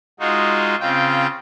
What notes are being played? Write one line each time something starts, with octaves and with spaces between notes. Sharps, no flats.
G#3 D#4 F4 F#4
C#3 C4 F4 G5